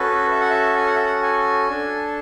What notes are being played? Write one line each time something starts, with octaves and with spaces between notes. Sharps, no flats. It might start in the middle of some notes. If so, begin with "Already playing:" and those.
Already playing: C#4 F#4 A4 B4
E5
F#5
E5
G#5
F#5
E5
F#5
G#5
D4 A4